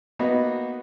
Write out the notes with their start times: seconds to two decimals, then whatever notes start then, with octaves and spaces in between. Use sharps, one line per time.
0.19 A#3 B3 D#4 F#4